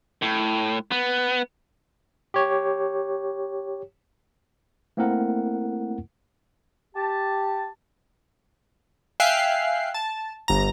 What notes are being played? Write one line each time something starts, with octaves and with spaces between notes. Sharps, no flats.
A2
B3
G4 C#5
A3 A#3 C4 E4 A#4 F#5
G4 A5
E5 F5 G5 G#5 F#6 C7
A5
G1 A#5